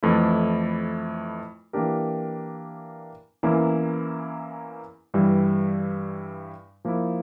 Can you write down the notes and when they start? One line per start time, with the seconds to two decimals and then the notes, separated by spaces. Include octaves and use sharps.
0.03 F2 E3 A3 E4
1.73 E3 A#3 D4 G4 A#4
3.43 E2 E3 A#3 C#4 E4
5.14 G2 E3 G3
6.85 F3 A#3 E4